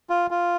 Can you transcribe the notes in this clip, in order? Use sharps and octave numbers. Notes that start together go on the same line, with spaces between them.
F4
F4